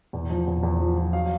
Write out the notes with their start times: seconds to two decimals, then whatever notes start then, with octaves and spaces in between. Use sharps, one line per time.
0.13 E2
0.30 F3
0.47 E2
0.63 E2
0.80 F3
0.97 F3
1.13 F#3 F5